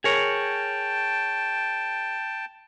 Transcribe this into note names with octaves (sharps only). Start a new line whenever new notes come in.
G#4 A#4 C#5 G5 A5